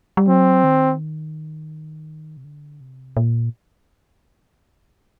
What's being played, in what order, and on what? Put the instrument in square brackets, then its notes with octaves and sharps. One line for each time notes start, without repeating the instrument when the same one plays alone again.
[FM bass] G3
[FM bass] F#3 [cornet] C4
[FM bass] D#3
C3
D3
C3
A#2